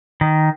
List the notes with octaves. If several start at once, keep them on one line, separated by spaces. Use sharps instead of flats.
D#3